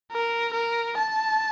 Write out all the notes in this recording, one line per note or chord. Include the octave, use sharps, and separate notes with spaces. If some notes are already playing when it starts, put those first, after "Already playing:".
A#4
A#4
A5